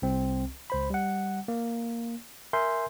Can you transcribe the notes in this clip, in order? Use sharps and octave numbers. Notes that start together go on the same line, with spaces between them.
C2 C4
C#2 C5 B5
G3 F#5
A#3
A#4 E5 G#5 C6 G6